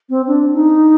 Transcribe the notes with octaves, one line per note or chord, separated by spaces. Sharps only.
C4
D4
D#4